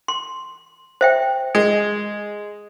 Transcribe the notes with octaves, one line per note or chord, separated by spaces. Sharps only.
C6
C5 E5 G5
G#3